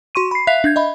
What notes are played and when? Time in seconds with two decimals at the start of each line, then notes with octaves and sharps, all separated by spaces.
0.15 F#4 C6 C#6 D#7
0.31 B5 C7
0.47 E5 F5 F#6 B6 C7 F7
0.64 D4 G6 G#6
0.76 D#5 E5 B5